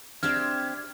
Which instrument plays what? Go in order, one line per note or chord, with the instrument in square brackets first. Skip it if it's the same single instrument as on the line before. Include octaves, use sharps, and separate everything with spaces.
[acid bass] C4 [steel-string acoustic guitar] D4 G4 E5 [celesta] F6 [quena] G#6